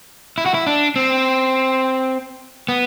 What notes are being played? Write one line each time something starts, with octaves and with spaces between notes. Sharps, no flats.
E4
F#4
E4
D4
C4
B3